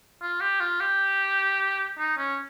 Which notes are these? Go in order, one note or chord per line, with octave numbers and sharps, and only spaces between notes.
F4
G4
F4
G4
D#4
C#4